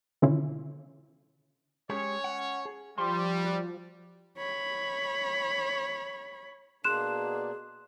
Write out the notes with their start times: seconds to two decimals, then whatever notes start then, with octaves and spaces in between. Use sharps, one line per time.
0.22 B2 D3 D#3 C#4 E4 F4
1.90 G#3 C#4 G4 G#4 C#5
2.24 F#5
2.65 G#4
2.98 F3 G3 C6
3.45 F#4
4.37 C#5 B5
6.84 B2 A#3 D4 G#4 C6 F#6 E7